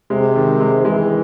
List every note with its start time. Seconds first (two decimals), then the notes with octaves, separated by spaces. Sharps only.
0.10 C3 G#3
0.36 D#3
0.60 G#3
0.84 E3 G#3